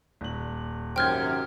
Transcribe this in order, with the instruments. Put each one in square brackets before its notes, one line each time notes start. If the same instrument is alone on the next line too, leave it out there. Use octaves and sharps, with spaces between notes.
[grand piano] D#1 F#7
[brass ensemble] G#1 F#2 C3 [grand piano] C5 G6 G#6 [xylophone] G5 F6